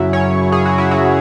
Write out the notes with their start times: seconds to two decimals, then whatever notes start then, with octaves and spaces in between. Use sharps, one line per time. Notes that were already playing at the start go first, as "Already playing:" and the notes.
Already playing: F#2 C#3 F#3 E4
0.13 C#4 C#5
0.52 G#4
0.65 F#4
0.78 E4
0.91 F#3 F#4